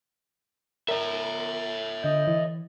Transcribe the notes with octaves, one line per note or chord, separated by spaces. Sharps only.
A#4 C#5 E5 A#5
D3 D#5 G6
E3